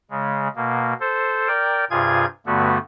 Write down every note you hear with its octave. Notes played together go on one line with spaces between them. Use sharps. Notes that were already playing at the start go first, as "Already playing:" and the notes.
C#3 G#3
B2 A#3
A4 C5
A#4 D5 G5
G2 C3 F4 G#4 G#6
G2 D3 A3 B3 F#4